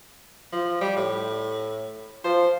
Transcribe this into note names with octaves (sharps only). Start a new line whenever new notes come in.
F3
G3
A2
F3 C5